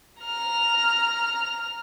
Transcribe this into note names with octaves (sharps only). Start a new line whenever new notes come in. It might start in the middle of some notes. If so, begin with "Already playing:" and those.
A#5 F6